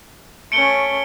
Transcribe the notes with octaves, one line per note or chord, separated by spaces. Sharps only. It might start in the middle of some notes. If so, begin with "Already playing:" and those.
A3 C#4 C#7 D7 G7